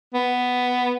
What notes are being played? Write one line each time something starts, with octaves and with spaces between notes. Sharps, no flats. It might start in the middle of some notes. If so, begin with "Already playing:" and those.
B3